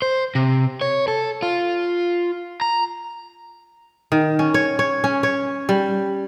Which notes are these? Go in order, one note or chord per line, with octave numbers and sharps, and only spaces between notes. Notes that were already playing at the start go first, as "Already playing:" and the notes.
C5
C3
C#5
A4
F4
A#5
D#3
C#4
C#5
C#5
C#4
C#5
G3